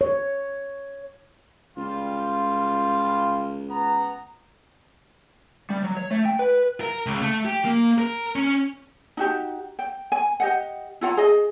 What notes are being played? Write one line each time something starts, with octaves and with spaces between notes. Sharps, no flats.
C#5
C#2 G3 F4
B3 A#5
G3
F#3
C#5
A3
G5
B4
A#4
C#2
A3
G4
A#3
A#4
C#4
D#4 F#4 G4
G5
G#5
G4 D#5 F#5
E4 F4 F#5 A#5
G#4 D#5